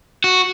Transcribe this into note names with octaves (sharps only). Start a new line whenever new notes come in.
F#4